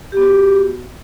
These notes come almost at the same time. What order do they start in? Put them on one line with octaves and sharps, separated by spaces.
G4 B3 F#4